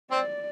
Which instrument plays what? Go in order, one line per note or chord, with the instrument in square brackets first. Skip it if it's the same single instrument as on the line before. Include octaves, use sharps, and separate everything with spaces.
[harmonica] C4 C5 [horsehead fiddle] D5